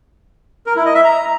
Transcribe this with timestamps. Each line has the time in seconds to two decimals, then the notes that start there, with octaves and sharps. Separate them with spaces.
0.66 A#4
0.76 E4
0.85 D#5
0.95 E5
1.04 A#5